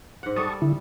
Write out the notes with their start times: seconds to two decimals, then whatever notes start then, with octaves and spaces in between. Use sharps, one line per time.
0.23 G#2 F#5
0.36 G3 A4 A5 C#6 D#6
0.62 D3 E4